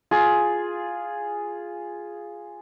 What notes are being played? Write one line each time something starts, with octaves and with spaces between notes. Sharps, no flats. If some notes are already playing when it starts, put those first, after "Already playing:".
F4 G#4